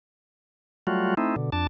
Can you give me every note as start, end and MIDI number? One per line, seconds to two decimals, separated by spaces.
0.87 1.14 54
0.87 1.14 55
0.87 1.14 57
0.87 1.14 65
0.87 1.14 66
1.17 1.36 57
1.17 1.36 60
1.17 1.36 63
1.17 1.36 64
1.36 1.50 47
1.36 1.50 50
1.52 1.67 41
1.52 1.67 62
1.52 1.67 81